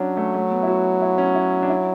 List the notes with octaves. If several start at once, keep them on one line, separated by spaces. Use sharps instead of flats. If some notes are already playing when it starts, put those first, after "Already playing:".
Already playing: F#3 C#4 D4
A3
A3
B3
E4
F#4
E4
C#4
E4
D4
E4